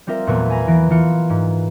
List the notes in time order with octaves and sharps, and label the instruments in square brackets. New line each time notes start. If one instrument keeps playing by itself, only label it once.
[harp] G3 C4 F4 A#4 E5
E2 A#2 E3 F#3 A3 B3
G#5 A#5 B5
E3 A#6 D7
E3 F4 C#7
G#2